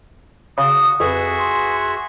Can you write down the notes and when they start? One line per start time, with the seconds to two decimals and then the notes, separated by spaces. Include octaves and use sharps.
0.58 C#3 F#4 D#6
1.00 F2 F#4 G#4 B4 E5
1.39 C6